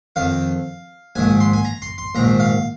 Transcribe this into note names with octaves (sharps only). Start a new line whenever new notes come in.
F2 D#3 F5
A#1 G#2 D#3 G#5
C6
G#5
A#5
C6
C6
A#1 G#2 D#3 A#5
F5